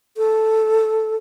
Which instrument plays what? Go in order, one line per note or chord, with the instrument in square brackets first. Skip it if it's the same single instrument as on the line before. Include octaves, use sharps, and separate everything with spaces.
[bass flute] A4